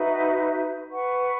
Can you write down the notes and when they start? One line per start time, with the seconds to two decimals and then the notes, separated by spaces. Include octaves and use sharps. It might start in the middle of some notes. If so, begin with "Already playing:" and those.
Already playing: D#4 F#4 B4 E5
0.90 B4 F#5 C#6